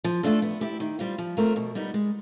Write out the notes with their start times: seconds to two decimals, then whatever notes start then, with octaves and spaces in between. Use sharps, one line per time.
0.04 F3
0.23 A3 D4 F4 A4
0.42 B3
0.61 E4 G4
0.80 D#3
0.99 G3 C4 F4
1.18 F3
1.37 A3 C4 F4 A#4
1.56 B2
1.75 G3 B3 D#4
1.94 G#3